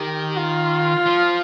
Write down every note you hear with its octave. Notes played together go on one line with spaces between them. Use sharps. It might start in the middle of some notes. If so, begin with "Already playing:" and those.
Already playing: D#3 G4
F4
F3